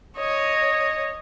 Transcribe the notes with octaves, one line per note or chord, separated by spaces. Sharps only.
C#5 D#5